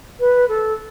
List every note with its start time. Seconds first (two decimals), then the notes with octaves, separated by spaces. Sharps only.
0.19 B4
0.48 A4